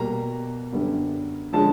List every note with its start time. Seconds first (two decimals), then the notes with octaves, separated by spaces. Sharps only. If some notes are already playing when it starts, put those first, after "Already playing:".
Already playing: B2 G3 A#3 A#5
0.72 F#2 D3 G3 B3
1.53 D3 F3 G#3 C#4 A5